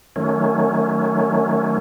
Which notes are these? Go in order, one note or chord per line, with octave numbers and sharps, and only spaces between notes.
D#3 F#3 A3 C#4